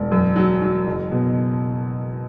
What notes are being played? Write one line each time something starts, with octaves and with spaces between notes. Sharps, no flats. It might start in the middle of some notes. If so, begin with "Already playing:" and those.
Already playing: E1
F#2
F#3
F#3
F#1
B2